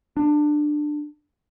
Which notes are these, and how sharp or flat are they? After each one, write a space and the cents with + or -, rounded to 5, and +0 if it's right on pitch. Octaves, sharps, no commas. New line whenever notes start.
D4 +20